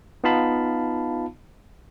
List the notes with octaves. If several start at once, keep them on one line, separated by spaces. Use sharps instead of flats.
B3 D#4 F4 F5 A5 B5